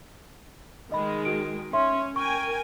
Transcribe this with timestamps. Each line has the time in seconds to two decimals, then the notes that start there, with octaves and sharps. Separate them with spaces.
0.92 D#3 G#3 D#5 B5
1.25 F#4 D7
1.73 C#4 E5 C6
2.16 A#4 G5 G#5 C#6